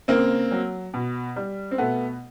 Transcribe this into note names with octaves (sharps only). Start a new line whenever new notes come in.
C#3 A#3 C4
F#3
B2
G3
C4
B2 A3 B3